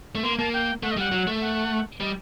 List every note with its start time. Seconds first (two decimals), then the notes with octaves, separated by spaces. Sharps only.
0.15 A3
0.23 A#3 C6
0.39 A#3 A5
0.53 G5
0.83 A3 F#5
0.91 D#5
0.97 G3 F#5
1.12 F#3
1.27 A3
1.41 F#5
2.00 G3 D#5